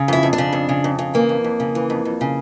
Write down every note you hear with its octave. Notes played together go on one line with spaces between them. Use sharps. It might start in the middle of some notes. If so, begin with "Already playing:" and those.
Already playing: C#3
F2 E4
F2
D4
C#3
F2
C#3
F2
C#3
E3 A#3
F2
F2
C#3
E3
F2
F2
C#3